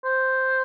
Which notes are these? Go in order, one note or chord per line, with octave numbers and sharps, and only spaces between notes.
C5